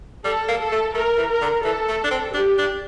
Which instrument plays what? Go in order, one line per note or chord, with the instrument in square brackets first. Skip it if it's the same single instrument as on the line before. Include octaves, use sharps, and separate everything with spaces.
[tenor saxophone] G3 [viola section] A4
[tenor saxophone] A#3
[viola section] A4
[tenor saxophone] A3
[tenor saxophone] A3 [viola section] A#4
[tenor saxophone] E3
[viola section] A#4
[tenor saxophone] D3
[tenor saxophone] E3 [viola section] A4
[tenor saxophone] A3
D4
C4
[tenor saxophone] D4 [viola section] G4
[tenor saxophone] D4